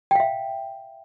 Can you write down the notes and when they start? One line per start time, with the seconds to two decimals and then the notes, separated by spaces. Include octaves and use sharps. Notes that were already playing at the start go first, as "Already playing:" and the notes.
0.11 G5
0.15 F5
0.20 E5